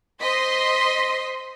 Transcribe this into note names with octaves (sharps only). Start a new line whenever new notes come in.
C5 D#5 C6 B6